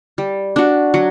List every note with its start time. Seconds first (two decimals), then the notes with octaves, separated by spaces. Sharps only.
0.18 G3
0.56 D4 F#4
0.94 F#3